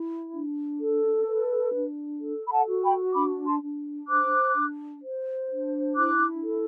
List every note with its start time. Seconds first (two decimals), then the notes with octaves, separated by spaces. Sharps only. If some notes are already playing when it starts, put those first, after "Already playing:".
Already playing: E4
0.33 D4
0.80 A4
1.27 B4
1.74 D4
2.20 A4
2.48 B5
2.52 F#5 A5
2.67 F#4
2.83 G5 B5
3.14 D4 B5 D6
3.45 A5 C6
3.62 D4
4.08 C5 D6 F#6
4.55 D4
5.02 C5
5.49 D4
5.95 E4 D6 F#6
6.42 A4